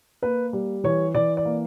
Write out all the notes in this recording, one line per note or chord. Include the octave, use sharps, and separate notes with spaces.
A#3 B4
G3
E3 C#5
E3 D5
D5
A#3